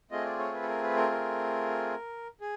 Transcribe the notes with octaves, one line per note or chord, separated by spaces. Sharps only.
A3 C4 F4 G#4 D#5
D5
C#5
B4
A4
A#4
B4
A#4
A#4
G#4